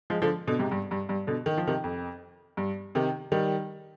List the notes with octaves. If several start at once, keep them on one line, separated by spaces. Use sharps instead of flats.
F3 G#3
D3 F3
B2 D3
G#2 C3
G2
G2
G2
B2 D3
D#3
F3
C3 D#3
F2
G2
C3 D#3
D#3 G3